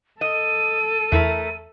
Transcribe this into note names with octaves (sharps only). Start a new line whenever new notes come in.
A4 D#5 D#7
E2 A3 E4 A#4 E5